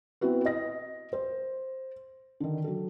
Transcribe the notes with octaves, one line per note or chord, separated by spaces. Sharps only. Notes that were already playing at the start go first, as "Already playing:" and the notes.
B3 C4 E4 F#4 B4
D#5 A#6
C5
D3 D#3
F#3 A4